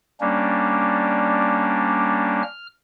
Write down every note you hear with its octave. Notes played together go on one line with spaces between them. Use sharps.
G3 A#3 C#4 D4
F6